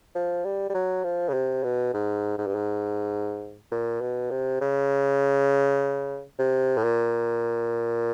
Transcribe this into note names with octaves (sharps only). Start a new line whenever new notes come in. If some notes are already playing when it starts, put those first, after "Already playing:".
F3
G3
G3
F#3
F3
C#3
C3
B2
G#2
G#2
G2
G#2
A#2
B2
C3
C#3
C3
A2
A#2